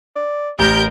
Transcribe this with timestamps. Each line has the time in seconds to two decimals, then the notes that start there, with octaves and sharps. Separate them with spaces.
0.16 D5
0.59 A1 G4 A#4 G6 D7